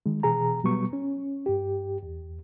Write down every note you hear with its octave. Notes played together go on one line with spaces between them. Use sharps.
D#3 G#3
B2 E3 G#4 A#5
B2 F#3 G3 B3 C#6
C#4
G2 G4
E2